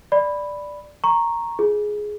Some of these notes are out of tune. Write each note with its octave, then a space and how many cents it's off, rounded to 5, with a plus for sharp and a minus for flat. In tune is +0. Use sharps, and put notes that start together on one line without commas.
D5 +0 B5 +0
A#5 +0 C#6 -15
F4 +0 G#4 +10